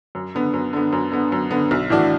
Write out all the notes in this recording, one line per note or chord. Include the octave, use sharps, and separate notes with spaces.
F#2
D3 B3
F#2
D3 B3
F#2
D3 B3
F#2
D3 B3
B1
A2 E3 D4 F#4